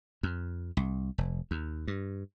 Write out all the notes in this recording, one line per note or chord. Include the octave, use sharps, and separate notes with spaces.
F2
C2
F1
D#2
G2